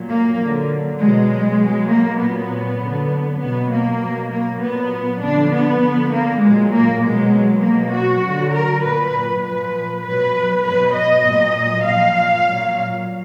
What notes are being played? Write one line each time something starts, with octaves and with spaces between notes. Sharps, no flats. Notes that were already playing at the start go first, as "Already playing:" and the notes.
Already playing: A#2 F#3
A#3
D3 F#3
B2 F#3 G#3
B2 F#3
A#3
A#2 F#3 B3
D3 F#3
B2 F#3 B3
A#3
B2 F#3
A#3
A#2 F#3 B3
D3 F3 D4
B3
D3 F3
A#3
A#2 F#3 G#3
A#3
B2 F#3 G#3
B2 F#3 A#3
F#4
D3 F#3
A#4
A#2 F#3 B4
A#2 F3 B4
B2 F#3 B4
B2 F#3 B4
D#5
A#2 F#3
A#2 F3 F5
A#2 F#3